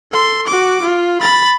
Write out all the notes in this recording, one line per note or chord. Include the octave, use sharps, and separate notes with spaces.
A4 C6
F#4 D6
F4
B5 A6